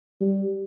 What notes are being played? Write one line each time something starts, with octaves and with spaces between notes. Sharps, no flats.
G3